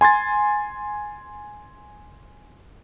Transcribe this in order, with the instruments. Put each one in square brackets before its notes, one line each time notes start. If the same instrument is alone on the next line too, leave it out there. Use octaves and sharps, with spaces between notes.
[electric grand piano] G#5 C6 G#6 A6